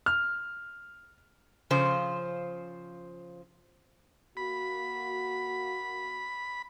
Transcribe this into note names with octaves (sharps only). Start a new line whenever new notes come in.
F6
C#3 F3 C5
A#3 F#4 B5